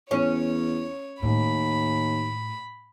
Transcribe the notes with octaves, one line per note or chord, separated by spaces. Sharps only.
E2 C#4 C#5
D#2 A2 B5